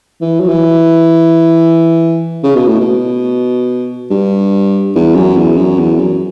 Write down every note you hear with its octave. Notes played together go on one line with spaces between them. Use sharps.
E3
F#3
E3
C#3
B2
A2
B2
G2
E2
F#2
E2
F#2
E2
F#2